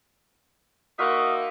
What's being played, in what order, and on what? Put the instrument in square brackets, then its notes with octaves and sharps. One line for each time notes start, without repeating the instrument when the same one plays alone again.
[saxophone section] A#3 D#4 E5 [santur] F#4 F5 C6 [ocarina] D#6